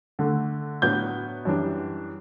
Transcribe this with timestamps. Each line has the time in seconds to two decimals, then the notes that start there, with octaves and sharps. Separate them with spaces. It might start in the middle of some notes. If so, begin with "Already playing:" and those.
0.19 D3 A3 D4
0.82 A2 F#3 B3 D4 G6
1.45 F#2 E3 G3 D4